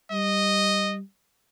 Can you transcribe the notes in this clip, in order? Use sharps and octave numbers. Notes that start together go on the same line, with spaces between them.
G3 D#5